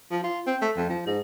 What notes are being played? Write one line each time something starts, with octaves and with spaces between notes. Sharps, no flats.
F3
F4
C4
A3
F2
F3
G#2